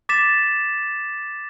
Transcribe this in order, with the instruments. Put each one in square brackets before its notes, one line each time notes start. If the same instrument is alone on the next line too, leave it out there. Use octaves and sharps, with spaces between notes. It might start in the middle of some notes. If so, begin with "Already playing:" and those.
[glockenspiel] D6 A6 B6 E7